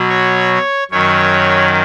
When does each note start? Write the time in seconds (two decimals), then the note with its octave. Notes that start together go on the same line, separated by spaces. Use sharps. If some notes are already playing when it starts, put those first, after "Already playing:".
Already playing: B2 F#3
0.09 C#5
0.91 F#2 D#3 F#3 C#5